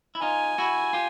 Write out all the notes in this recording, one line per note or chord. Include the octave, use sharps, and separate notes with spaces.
E4
D#4 F4 G#5
E4 F#4
F4 G4